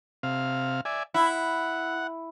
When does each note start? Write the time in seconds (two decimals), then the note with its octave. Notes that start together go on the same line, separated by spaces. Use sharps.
0.23 C3 F5
0.85 D5 E5 G#5
1.14 E4 F#5